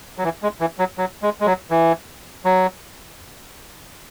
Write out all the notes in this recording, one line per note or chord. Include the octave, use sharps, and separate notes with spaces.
F#3
E3
G#3
E3
F#3
F#3
G#3
G#3
F#3
E3
F#3